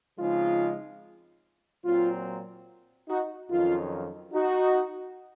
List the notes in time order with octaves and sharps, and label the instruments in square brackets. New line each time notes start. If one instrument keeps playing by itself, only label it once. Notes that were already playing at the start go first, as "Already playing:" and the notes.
[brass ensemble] C#3 F3 G#3 C4 D#4 F4
A#2 F#3 C4 F4
D#4 F#4
F2 D#3 F#3 C#4 F4
D#4 F#4